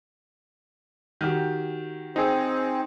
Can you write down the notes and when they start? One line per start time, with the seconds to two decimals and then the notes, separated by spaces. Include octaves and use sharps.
1.21 D#3 F#4 G4
2.16 C4 D#4 G#4